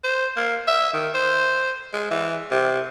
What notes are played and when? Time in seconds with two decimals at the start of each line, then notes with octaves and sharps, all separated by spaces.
0.04 C5
0.36 A#3
0.67 E5
0.93 D#3
1.14 C5
1.93 G#3
2.11 E3
2.51 C3